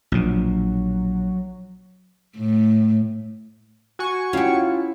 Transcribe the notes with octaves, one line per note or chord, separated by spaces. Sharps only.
A#1 B2 F#3
A2
F#4 G#5 C#6
C#4 E4 F4 G4 F5 F#5